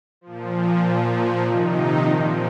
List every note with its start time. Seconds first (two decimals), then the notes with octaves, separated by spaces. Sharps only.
0.21 A#2 F3
0.81 A#2 F3
1.42 C3 D#3 D#4
2.01 A#2 F3 D4